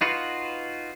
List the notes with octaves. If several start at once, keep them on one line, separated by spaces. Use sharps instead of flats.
D#4 F4 F#4 B4